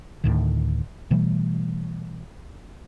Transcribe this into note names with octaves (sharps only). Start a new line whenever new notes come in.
D2 A2 D#3
B2 E3 G3 A3